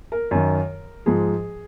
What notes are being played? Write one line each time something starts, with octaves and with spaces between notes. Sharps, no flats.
A#4
F#2 D#3
G#2 F3 G#4